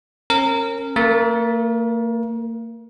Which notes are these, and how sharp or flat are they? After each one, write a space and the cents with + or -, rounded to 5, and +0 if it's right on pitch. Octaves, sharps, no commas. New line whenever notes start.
C#4 -35 A#4 -20
A#3 -35 A#4 +30